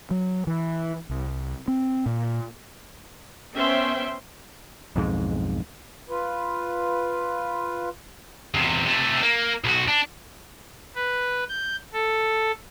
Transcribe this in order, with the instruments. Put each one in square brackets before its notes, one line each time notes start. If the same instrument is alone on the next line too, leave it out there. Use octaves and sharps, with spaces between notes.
[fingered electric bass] F#3
E3
C2
C4
A#2
[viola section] B3 C#4 C5 E5 G5 C6
[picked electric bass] B1 F2 G#2
[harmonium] F4 B4
[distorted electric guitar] E2 C3
C3 A3
A#3
B1 F#4
D4
[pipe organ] B4
G6
A4